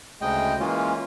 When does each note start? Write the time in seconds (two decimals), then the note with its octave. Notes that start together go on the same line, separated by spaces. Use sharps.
0.21 D2 C#3 G#3 D#5 G5
0.60 E3 G#3 A#3 C#4 F4